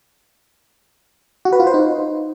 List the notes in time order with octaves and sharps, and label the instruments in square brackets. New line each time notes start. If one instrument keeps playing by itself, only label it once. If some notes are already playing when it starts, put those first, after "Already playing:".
[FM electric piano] F#4
B4
F4
C5
D#4